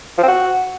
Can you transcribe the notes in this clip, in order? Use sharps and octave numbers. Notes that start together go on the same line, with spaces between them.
F3
C4
F#4